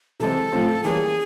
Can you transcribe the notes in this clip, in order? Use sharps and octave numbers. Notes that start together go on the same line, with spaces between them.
C3 E3 G#3 C4 A4
A2 F3 A3 C4 F4
E3 G3 A#3 C#4 G#4